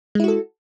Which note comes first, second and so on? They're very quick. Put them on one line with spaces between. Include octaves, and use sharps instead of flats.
G#3 E4 F#4 A4